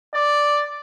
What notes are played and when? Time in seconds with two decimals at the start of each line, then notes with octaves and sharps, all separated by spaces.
0.15 D5